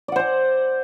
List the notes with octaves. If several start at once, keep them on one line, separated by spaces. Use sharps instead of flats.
C5 D5 F#5 G#5